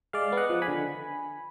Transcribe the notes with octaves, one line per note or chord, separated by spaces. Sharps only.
G#3 D5 F5
B3
D#5 F#5
F3
G#5 B5
D3